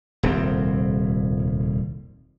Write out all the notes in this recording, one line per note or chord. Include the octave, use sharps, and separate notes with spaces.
D#1 C2 F2 C4